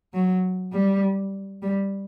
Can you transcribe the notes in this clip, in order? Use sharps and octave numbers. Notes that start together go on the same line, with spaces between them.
F#3
G3
G3